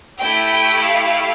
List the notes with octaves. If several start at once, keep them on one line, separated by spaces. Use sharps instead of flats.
A3 E4 G4 G5
F5